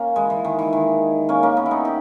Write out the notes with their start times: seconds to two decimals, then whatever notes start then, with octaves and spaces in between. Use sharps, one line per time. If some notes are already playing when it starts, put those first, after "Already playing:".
Already playing: A#3 C#4
0.16 E3 G#3
0.30 E3
0.45 D#3
0.59 E3
0.73 D#3
1.29 A#3 C#4
1.43 A#3 C#4
1.57 B3 D#4
1.66 E4
1.71 B3 D#4
1.85 D#4 G4